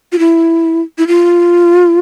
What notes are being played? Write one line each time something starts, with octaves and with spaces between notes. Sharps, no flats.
F4
E4
E4
F4